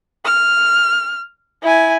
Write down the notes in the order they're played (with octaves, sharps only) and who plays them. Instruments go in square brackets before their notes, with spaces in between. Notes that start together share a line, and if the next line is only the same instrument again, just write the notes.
[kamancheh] F6
E4 G#5